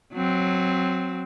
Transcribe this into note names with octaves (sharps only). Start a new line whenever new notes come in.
F#3 C4